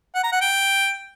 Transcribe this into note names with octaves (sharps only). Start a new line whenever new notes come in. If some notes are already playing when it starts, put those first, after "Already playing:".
F#5
A#5
F#5
G5